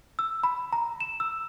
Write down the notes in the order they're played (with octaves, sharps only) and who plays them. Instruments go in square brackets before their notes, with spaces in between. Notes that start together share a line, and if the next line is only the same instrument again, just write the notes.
[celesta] E6
B5
A#5
E7
E6